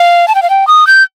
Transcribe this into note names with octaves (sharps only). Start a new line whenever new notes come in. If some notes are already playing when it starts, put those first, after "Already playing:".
Already playing: F5
A5
G5
F5
G5
D#6
G6